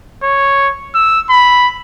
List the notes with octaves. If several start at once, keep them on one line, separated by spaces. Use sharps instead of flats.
C#5
E6
B5